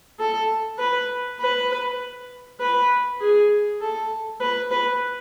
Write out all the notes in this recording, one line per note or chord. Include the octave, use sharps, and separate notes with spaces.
A4
B4
B4
B4
G#4
A4
B4
B4